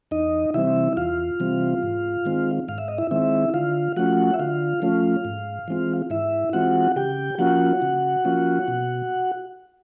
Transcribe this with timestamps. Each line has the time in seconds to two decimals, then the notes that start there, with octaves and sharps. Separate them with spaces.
0.11 E2 D#4 D#5
0.54 C3 E3 G3 C4 E4 E5
0.97 E2 F4 F5
1.40 C3 E3 G3 C4
1.83 G#2
2.25 D#3 G#3 C4
2.68 G#2 F5
2.78 E5
2.88 D#5
2.98 E4 E5
3.11 D#3 G#3 C4 E4 E5
3.54 D3 F4 F5
3.96 F3 A3 C#4 F4 F#4 F#5
4.34 E5
4.39 D3 F4 F5
4.82 F3 A3 C#4 F4
5.25 G#2
5.68 E3 G#3 C4 F4
6.10 G#2 E4 E5
6.53 E3 G#3 C4 F4 F#4 F#5
6.96 C#3 G4 G5
7.38 F3 A#3 C#4 F4 F#4 F#5
7.82 C#3
8.25 F3 A#3 C#4 F4
8.68 B2